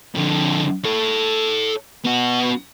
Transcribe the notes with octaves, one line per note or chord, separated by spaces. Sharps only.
F2 D3
A4 C#5
B3 F#4